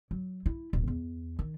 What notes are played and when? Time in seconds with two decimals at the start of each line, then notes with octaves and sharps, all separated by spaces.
0.11 F#3
0.46 E4
0.73 D1
0.87 E2
1.39 D#3